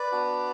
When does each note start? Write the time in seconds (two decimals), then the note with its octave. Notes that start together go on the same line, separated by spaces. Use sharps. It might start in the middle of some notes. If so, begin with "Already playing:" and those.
Already playing: B4 D5
0.12 B3 D4 F#4